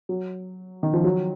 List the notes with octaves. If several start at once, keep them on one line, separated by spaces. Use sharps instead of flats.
F#3
D#3
F3
F#3